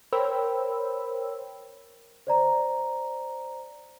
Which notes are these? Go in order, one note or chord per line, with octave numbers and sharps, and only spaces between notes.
A#4 C5 C#5 G5 B5 E6
C5 D5 A#5